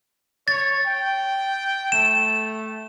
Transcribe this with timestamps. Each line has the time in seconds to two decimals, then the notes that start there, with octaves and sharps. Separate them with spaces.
0.48 C#5 A6
0.86 G5
1.92 A3 E7